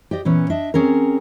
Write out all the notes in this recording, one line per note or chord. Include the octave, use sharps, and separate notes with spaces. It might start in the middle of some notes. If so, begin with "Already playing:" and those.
G4 D5 D#5
A#2 E3 B3 C#4
D4 D#5 E5
C4 C#4 G#4 A#4